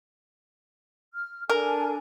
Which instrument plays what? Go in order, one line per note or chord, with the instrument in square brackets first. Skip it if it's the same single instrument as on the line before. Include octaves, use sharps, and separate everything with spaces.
[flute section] F6
[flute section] D4 A4 G#5 [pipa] A#4